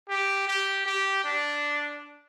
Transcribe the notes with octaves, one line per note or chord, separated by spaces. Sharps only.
G4
G4
G4
D4